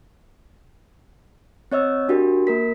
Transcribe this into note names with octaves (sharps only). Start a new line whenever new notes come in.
C4 C#5 D#5 E6
D4 F#4 G4 A#4
A#3 A#4 B6